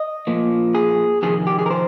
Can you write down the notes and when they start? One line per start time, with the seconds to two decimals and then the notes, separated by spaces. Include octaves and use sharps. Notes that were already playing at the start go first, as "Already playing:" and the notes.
Already playing: D#5
0.27 A#2 F3 A#3
0.75 G#4
1.22 F2 C3 D#3 G#4
1.47 G4
1.59 G#4
1.66 A#4
1.71 C5